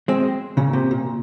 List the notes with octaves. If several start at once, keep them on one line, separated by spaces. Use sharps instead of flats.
G#3 C4
A#2 C#3
C3
A#2